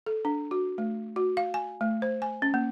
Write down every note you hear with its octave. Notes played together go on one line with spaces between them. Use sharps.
A4
D4
F#4
A3
F#4
F5
G#5
A3
C5
G#5
C#4
A#3